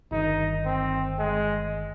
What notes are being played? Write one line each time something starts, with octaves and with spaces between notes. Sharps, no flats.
G1 G2 D#3 D#4
C4
G#3